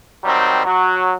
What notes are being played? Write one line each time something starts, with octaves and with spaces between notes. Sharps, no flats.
D#3 F#3 G3 C4
F#3 F#4